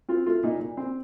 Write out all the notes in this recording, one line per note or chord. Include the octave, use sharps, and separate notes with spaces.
C4 F4
A3 F4
A#2 D#4
A#2
C4